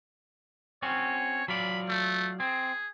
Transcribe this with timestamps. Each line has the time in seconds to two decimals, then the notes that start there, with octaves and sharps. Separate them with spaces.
0.82 C4 C#4 F#4 C#5
1.48 F#3 F4 D5 B5
1.89 A3
2.40 C4 G#4